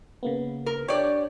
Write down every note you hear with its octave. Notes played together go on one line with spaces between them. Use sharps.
C#3 A#3 B3
A#4
D4 G4 C#5 D5